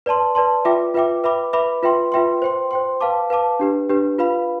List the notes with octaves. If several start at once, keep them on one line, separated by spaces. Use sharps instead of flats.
B4 D5 A5 C6
B4 D5 A5 C6
F4 B4 E5 G5 D6
F4 B4 E5 G5 D6
B4 E5 B5 D6
B4 E5 B5 D6
F4 B4 E5 G5 C6
F4 B4 E5 G5 C6
C5 G5 C6
C5 G5 C6
B4 F5 A5 D6
B4 F5 A5 D6
D4 G4 B4
D4 G4 B4
F4 B4 F5 B5